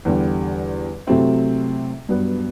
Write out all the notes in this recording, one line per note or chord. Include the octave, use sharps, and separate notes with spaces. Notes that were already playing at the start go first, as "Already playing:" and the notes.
E2 D3 G3
C3 F#3 A3 C4 E4
G2 F#3 B3 D4